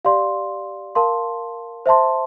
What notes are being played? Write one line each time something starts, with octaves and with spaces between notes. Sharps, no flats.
G4 D5 F5 C6
A#4 F5 A5 C6
C5 E5 A5 C6